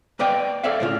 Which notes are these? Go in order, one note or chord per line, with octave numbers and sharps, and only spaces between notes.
A#3 B4 D5 D#5 G5
A4 C#5 D5 E5 F5
A2 C#3 F4